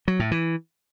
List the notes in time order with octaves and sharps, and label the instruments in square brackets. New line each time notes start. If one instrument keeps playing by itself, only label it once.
[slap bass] F#3
A2
E3